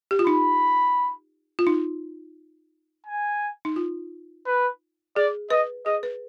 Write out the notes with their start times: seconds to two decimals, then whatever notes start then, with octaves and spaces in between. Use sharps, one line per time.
0.11 G4
0.19 F4
0.27 D#4 B5
1.59 F4
1.67 D#4
3.06 G#5
3.65 D#4
3.76 F4
4.46 B4
5.16 G#4 D5
5.50 B4 D#5
5.86 G#4 D#5
6.03 B4